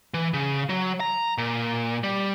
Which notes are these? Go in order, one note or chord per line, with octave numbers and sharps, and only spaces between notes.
E3
C#3
F#3
A#5
A#2
G3